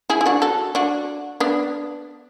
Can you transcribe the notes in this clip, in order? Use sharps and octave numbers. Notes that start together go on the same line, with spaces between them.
E4 G#4
E4
D4 F#4
F#4 A4
D4 F#4
B3 D4